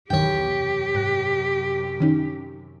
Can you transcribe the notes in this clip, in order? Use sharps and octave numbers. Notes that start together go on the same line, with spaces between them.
B1 E2 G2 D#3 G4 C#5 G5
F#2 C3
G#2 F#6 A#6
D#3 C#4 D#4